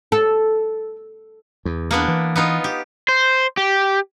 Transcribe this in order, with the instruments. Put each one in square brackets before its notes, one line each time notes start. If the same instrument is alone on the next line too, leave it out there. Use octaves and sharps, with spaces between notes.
[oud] A4
[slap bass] E2
[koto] A#3 B3 D4
[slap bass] E3
[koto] B3 D#4 F4
G4
[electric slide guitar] C5
G4